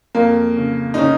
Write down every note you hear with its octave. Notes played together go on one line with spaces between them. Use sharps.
F2 A#3
C#3
D#4
C#3 C#4